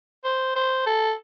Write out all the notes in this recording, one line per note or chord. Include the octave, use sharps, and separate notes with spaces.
C5
C5
A4